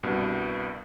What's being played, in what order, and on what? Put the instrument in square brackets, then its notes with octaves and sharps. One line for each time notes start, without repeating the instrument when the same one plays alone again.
[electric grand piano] C2 G2 B2